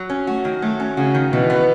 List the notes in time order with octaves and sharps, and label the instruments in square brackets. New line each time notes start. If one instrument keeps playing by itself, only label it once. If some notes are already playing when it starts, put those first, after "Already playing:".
Already playing: [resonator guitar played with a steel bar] F#3
C#4
[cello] A3 [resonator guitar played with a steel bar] F#4
[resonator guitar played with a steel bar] D#3
[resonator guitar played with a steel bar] F#3 [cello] A3
[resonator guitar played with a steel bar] C#4
[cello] C#3 [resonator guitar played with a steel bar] F#4
[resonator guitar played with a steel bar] D#3
[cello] B2 [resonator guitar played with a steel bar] E3
[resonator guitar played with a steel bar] B3